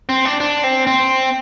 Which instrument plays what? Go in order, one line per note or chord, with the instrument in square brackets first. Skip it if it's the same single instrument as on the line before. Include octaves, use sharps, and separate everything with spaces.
[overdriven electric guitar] C4
D4
D4
C4
C4